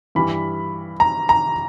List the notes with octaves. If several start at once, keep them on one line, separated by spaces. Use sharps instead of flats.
G2 E3 G3 B5
A#5
A#5